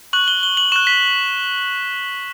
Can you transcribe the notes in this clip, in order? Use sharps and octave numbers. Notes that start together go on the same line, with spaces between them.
C#6 F#6 F#7
G7
G7
F#7
C#6 F#6 E7
B6